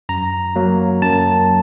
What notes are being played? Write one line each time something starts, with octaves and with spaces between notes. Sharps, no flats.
F#2 A#5
F#3 A#3
F#2 A5